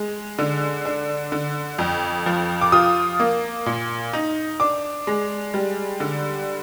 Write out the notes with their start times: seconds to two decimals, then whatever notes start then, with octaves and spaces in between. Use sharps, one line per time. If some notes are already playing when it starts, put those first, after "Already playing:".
Already playing: G#3
0.39 D3
0.85 D4
1.32 D3
1.79 F2
2.26 F3
2.62 D6
2.72 F4 D#6
3.20 A#3
3.66 A#2
4.13 D#4
4.60 D4 D6
5.07 G#3
5.54 G3
6.00 D3